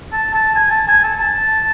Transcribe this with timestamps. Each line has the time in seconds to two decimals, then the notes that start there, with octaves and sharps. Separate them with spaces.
0.12 A5
0.34 A5
0.56 G#5
0.71 A5
0.88 G#5
1.04 A5
1.20 A5